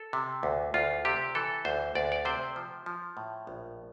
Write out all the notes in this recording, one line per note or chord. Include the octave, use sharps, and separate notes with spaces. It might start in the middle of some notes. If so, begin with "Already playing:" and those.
Already playing: A4
C3
D2
D2 F4
C3 G4
E3 A4
D2 C5
D2 D5
D5
C3 C5
F3
F3
A2
A#1